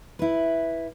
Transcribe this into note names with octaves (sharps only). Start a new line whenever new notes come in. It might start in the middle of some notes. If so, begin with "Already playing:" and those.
E4 B4